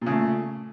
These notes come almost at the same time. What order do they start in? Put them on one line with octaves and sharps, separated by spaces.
A#2 C#3 A3